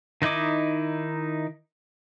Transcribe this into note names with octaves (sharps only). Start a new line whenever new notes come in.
D#3 D#4 E4 D#5 D6